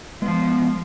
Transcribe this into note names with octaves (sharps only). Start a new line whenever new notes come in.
F3 G#3 B3